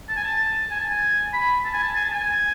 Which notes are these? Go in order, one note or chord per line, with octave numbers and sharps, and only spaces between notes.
A5
G#5
A5
G#5
A5
G#5
B5
A5
G#5
A5
G#5
A5
G#5